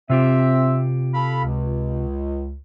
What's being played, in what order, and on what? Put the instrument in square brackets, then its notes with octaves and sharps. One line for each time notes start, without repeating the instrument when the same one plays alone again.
[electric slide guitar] C3 F4 G4 [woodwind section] C4 E5
[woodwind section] A4 F5 B5
C#2